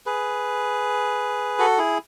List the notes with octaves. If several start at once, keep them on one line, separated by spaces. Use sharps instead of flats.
G#4 B4
F#4 A4
E4 G#4